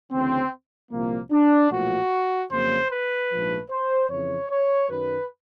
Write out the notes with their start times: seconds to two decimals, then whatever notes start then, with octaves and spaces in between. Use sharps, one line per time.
0.12 D2 C#3 E3 C4
0.91 C2 A#2 F3 A#3
1.32 D4
1.71 B1 A#2 F3 A3 F#4
2.51 F2 C#3 F#3 A#3 C5
2.91 B4
3.31 A#1 G#2 F3 A3
3.71 C5
4.10 F2 C#3 E3 C#5
4.50 C#5
4.89 F#2 D#3 F#3 B4